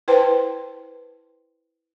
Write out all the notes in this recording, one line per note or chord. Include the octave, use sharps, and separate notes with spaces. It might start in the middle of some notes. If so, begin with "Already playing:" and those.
E4 B4 C5 G5 A5 C6